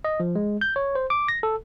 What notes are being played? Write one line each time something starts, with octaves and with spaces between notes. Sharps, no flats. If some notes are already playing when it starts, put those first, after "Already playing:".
D#5
F3
G#3
G6
C#5
C5
D6
A#6
A4